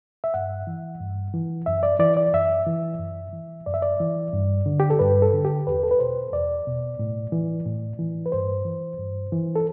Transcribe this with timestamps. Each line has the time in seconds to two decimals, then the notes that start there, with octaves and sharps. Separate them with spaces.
0.24 E5
0.34 G2 F#5
0.67 E3
1.00 G2
1.34 E3
1.66 F#2 E5
1.83 D5
1.99 E3 D5
2.17 D5
2.33 F#2 E5
2.67 E3
3.00 F#2
3.33 E3
3.66 F#2 D5
3.74 E5
3.82 D5
4.00 E3
4.33 G2
4.66 D3
4.80 G4
4.90 A4
4.99 G2 B4
5.22 A4
5.33 D3
5.45 G4
5.67 E2 B4
5.83 A4
5.91 B4
5.99 B2 C5
6.33 E2 D5
6.67 B2
6.99 A2
7.32 E3
7.66 A2
7.99 E3
8.26 B4
8.32 G2 C5
8.65 E3
8.99 G2
9.32 E3
9.56 A4